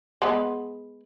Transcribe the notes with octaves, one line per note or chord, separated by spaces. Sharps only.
G#3 B3